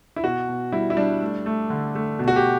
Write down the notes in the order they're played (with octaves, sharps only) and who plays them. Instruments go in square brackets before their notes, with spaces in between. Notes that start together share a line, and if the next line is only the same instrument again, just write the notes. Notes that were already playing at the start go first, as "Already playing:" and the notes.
[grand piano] E4
B2 F#4
B2
G3 E4
E4
G3 D4
A3
A3
D3
A3
B2
F#4
G4